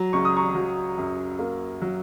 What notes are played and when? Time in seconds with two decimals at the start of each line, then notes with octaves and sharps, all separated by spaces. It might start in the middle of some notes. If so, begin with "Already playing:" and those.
Already playing: F#3 A#5
0.13 C#2 C#6
0.25 D#6
0.37 A#5 C#6
0.55 F#3
0.98 F#2
1.39 A#3
1.82 F#3